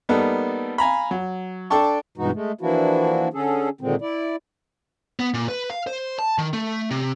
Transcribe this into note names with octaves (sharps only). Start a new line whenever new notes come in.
G3 A#3 B3 D#4 A4
F5 G#5 A#5 B5
F#3
D4 A4 D5 G5 A5 C#6
G2 B2 E3 G#3 D#4 F#4
G#3 A3
E3 F3 A#3 D4 E4 F#4
D3 C#4 G#4 A4
A#2 D3 D#3 G#3 C4
E4 D5
B3
A#2
B4
F5
C5
A5
D#3
A3
C3